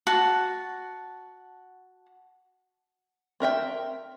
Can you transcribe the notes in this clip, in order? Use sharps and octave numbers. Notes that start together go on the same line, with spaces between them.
F#4 A5
C4 A#4 E5 G5